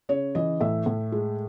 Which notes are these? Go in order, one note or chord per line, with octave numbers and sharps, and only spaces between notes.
C#3 C#5
E3 D#5
A2 E5
A2
G#3